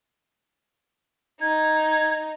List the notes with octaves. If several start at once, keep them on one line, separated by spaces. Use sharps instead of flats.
D#4 G#6